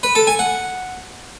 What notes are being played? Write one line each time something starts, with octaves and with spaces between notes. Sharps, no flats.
B4
A4
G#5
F#5